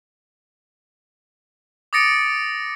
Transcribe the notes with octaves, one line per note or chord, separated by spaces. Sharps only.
D6 D#6 A6 A#6 C#7 D7